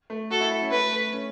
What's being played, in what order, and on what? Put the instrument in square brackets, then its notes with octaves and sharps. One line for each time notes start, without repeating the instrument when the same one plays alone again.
[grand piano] A3
[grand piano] F#4 [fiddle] A4
[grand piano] E4
E4
C#4
[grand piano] A3 [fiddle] B4
[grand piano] A3
C#4